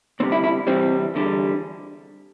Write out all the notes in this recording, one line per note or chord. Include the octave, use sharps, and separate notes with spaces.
D2 C3 G3 C4
E4
E4
C2 C3 E3 G3 C4
E2 D3 G3